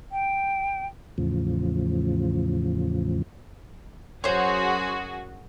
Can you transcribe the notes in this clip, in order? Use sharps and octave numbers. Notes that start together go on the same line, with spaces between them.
G5
E2 A2 C#3 F3
F#2 F#4 G#4 C5 C#5